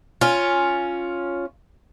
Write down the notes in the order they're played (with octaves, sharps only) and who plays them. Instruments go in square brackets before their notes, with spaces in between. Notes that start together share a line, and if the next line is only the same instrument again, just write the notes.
[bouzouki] C#4 F4